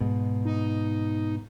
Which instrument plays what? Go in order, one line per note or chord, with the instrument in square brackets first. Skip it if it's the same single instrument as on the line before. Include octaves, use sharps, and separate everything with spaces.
[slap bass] G#2 B2
[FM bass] D#4